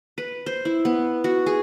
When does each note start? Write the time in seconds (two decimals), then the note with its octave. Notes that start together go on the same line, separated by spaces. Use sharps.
0.18 B4
0.46 C5
0.65 E4
0.85 B3
1.24 F#4
1.46 G#4